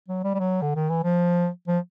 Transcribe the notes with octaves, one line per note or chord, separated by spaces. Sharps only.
F#3
G3
G3
F#3
D3
D#3
E3
F3
F3